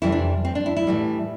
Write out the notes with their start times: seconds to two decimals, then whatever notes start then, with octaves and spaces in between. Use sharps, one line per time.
0.02 F2 C3 E3 G3 E4
0.12 D4
0.45 C4
0.55 D4
0.66 E4
0.77 E4
0.87 A2 E3 G3